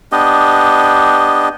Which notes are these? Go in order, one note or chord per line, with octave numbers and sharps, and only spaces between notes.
B3 D4 G4 D#5